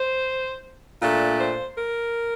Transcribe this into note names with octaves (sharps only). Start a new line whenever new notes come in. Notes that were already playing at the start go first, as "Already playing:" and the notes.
Already playing: C5
A#2 A3 D4
C5
A#4